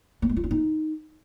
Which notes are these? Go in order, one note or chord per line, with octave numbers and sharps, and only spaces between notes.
A3
G#3
F4
E4
D#4